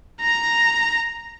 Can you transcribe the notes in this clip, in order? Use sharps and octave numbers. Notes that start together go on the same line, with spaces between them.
A#5 A#6